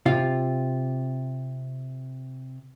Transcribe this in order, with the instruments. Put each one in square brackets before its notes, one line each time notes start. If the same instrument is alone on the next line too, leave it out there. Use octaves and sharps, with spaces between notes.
[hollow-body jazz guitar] C3 F4 F5